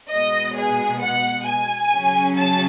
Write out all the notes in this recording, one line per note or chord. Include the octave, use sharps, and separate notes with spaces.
B2 G#3 B3 D#5
G#4
F#5
G#5
C#3 F#3 C#4
A5